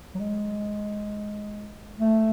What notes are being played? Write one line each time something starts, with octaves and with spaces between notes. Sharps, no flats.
F#3
G#3
A3